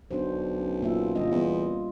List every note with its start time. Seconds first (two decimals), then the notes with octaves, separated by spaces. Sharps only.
0.11 B1 D4 F#4 C5
0.59 C#4
0.83 A#3 F4 E5
1.15 G1 F4 D#5
1.31 E2 G3 F4